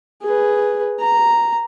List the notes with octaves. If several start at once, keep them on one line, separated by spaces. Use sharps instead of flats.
G#4 B4
A#5